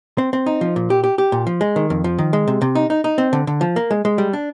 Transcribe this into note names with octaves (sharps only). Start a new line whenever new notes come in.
C4
C4
D#4
F3
A#2
G4
G4
G4
A#2
F3
G#3
D#3
F2
F3
D#3
G#3
C3
C3
D#4
D#4
D#4
C4
D3
D3
F3
A#3
G#3
G#3
G3
D4